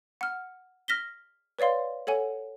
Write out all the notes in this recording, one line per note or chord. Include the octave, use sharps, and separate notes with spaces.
F#5 F6
F6 A#6 B6 G7
B4 C#5 D5 F5 C6
A4 C#5 F#5 G#5